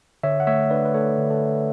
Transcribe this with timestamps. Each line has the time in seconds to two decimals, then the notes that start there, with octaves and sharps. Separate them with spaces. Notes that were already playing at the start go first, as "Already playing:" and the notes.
0.23 D3 C#5 E5
0.40 F#5
0.47 A3 C#5 E5
0.70 D4 B4 D5
0.85 B4
0.94 A3 A4 C#5
1.18 D3
1.30 A4
1.42 D3